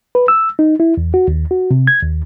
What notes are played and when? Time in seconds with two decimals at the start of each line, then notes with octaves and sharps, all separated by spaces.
0.15 B4
0.28 E6
0.59 D#4
0.80 E4
0.97 E2
1.14 F#4
1.28 D#2
1.51 F#4
1.71 C3
1.87 G#6
2.02 D#2